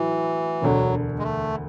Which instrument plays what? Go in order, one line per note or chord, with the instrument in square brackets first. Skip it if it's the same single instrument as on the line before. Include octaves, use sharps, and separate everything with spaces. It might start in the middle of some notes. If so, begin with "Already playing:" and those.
Already playing: [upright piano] A2 F#3 [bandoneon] E3
[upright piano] E1 D2 D3 [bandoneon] F#3
[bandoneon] G#3
A3